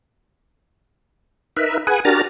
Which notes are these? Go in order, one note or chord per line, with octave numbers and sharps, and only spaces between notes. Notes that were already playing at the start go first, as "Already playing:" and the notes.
D#4 A#4 B4 E5
G#4 B4 F#5 G#5
D4 F#4 G4 A#4 A#5 A6